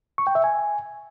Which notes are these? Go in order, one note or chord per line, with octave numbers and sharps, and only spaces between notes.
C#6
G5
E5
G#5